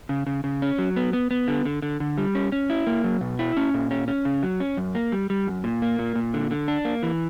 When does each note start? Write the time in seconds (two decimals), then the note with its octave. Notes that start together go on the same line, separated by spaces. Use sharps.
0.09 C#3
0.27 C#3
0.44 C#3
0.62 C#4
0.79 F#3
0.96 B3
1.13 B3
1.31 B3
1.48 D3
1.65 D3
1.82 D3
2.00 D3
2.18 G3
2.35 C#4
2.52 C#4
2.70 E4
2.87 A#3
3.04 F#3
3.21 B2
3.39 E4
3.57 C#4
3.74 A#2
3.91 C#4
4.08 C#4
4.25 C#3
4.43 F#3
4.60 C#4
4.77 F#2
4.95 A#3
5.12 G3
5.30 G3
5.47 F#2
5.64 A#2
5.82 A#3
5.99 A#2
6.15 A#2
6.34 D3
6.51 D3
6.68 D4
6.85 A#3
7.03 E3